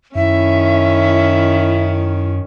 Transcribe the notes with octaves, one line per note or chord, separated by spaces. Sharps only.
F#2 D#3 C#4 E4 E5